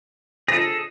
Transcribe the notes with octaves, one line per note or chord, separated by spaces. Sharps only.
G#4 A4 A#6